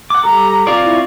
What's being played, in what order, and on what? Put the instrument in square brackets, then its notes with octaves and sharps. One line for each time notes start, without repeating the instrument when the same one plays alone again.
[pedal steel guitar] F#5 D6
[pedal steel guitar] G3 G4 A4 [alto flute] A#5
[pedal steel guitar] C4 C#6 [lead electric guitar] F4 D5
[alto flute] E4